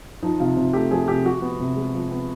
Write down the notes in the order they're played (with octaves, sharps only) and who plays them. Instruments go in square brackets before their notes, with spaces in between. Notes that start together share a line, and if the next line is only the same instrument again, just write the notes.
[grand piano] F3 D#4
C3 F4
C3
A3 G4
F3 G#4
C3 G4
F3 F#4
B3
C3
G#3
F3
B3